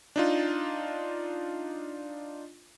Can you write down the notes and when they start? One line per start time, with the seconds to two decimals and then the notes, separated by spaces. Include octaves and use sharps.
0.16 D4 D#4 F4